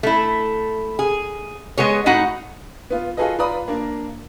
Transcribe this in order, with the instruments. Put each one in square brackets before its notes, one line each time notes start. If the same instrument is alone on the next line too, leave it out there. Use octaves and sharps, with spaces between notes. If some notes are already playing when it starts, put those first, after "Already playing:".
[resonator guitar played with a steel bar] A3 E4
G#4
G#3 B3 G#4 C#5
A2 D#4 F#4 F#5
[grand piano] B3 F4
F4 F#4 G#4 A4 B4 D#5
F4 B4 D5 A#5 B5 D#6
A#3 D4 A#4